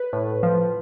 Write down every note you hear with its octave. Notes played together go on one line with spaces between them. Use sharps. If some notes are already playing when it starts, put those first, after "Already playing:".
Already playing: B4
A2
F3